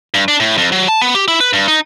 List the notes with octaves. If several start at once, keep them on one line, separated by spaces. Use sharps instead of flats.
G2
D4
A2
F2
F#3
A5
B3
G4
E4
B4
G2
D#4